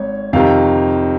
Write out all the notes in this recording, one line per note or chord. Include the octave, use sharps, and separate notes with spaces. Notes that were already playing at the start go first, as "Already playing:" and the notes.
Already playing: G#1 G#2 C#5
F2 C3 D#3 F5